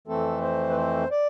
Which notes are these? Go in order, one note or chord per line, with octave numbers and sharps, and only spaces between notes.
F2 E3 A3 C4 A4
C5
B4
C5
D5